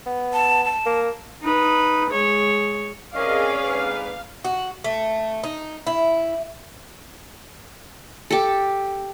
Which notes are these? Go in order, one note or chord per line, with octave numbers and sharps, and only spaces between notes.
B3
A5
A5
A#3
D#4 B4
G#3 C#5
C3 C4 C#4 G#4 A#4 D5 D#5 F5
D2 G#2 B4
F#4
A3
D#4
E4
G4 A4